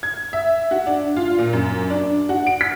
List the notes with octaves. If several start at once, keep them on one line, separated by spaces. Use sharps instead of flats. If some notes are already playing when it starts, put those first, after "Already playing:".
G#6
E5
F#4
D4
F4
A#2
F#2
D4
F#4
D7
B6